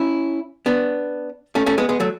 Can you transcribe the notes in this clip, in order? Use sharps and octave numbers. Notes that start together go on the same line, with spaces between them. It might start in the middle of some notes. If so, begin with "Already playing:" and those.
Already playing: C#4 E4
B3 D4
A3 C#4
A3 C#4
G#3 B3
G#3 B3
F#3 A3